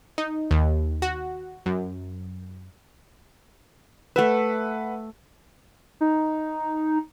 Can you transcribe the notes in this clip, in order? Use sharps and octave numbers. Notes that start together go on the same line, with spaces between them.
D#4
D#2
F#4
F#2
A3 B4 E5 F#5
D#4